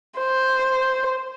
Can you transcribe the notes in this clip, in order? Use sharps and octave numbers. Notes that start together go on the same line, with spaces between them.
C5